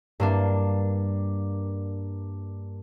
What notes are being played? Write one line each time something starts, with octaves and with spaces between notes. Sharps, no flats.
G2 A#3 D4